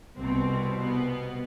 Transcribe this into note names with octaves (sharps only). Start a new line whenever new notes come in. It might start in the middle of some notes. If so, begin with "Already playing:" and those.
C2 B2 C4
B3